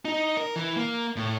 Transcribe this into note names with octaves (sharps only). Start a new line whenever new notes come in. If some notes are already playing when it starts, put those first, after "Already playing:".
D#4
A#4
E3
A#3
A2